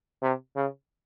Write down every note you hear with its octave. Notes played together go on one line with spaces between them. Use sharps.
C3
C#3